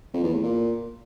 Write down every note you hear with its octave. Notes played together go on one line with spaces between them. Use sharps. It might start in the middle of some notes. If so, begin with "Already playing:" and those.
F2
E2
A2
A#2